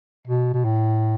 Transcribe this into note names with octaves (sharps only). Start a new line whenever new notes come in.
B2
B2
A2